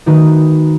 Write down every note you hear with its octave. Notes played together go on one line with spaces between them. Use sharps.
D#3 A3 D#4 F#4 B4